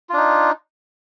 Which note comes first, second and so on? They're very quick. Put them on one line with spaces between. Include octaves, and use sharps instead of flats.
F4 D4 D#4